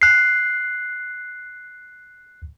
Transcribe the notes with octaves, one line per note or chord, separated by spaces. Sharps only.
F#6 C7